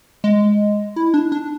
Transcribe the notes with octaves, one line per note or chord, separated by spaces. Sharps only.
G#3
E4
D4
D4